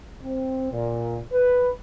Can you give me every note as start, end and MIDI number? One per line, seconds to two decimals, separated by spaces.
0.24 0.70 60
0.72 1.19 46
1.33 1.69 71